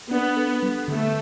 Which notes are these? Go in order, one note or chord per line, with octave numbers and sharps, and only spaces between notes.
B3 D4
A4
G3
D3 A3